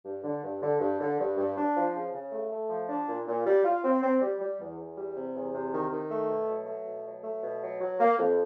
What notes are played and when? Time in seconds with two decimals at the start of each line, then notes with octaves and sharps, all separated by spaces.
0.04 G2
0.23 D3
0.43 G2
0.62 D3
0.80 G2
1.00 D3
1.18 G2
1.37 G2
1.56 D4
1.75 F3
1.94 C#3
2.13 C#3
2.31 A3
2.51 A3
2.69 F3
2.89 D4
3.07 A#2
3.27 A#2
3.45 G3
3.64 F4
3.83 C4
4.02 C4
4.20 G3
4.40 G3
4.59 E2
4.78 E2
4.96 G3
5.15 C3
5.35 E2
5.53 C3
5.72 D#3
5.91 D#3
6.10 A3
6.29 B2
6.47 F#3
6.66 A3
6.86 B2
7.04 F#3
7.23 A3
7.42 B2
7.61 F#3
7.80 F#3
7.99 A#3
8.18 F2